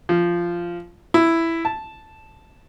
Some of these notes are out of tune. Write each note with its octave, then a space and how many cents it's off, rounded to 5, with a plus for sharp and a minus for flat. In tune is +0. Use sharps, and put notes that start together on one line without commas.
F3 -10
E4 +5
A5 -5